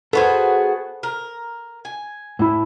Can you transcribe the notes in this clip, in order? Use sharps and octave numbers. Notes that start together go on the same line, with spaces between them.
B3 F#4 G#4 A4 B4 C5
A#4
G#5
A2 E4